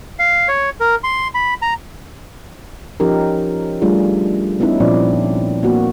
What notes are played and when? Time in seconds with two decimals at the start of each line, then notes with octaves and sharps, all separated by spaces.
0.19 F5
0.48 C#5
0.80 A#4
1.04 C6
1.34 B5
1.62 A#5
3.00 F3 C#4 D#4 G4 A#4
3.82 G3 A3 D4 F4 G#4
4.60 B3 C#4 D#4 E4 B4
4.80 A#2 F3 C4 D4 D5
5.63 A#3 B3 F#4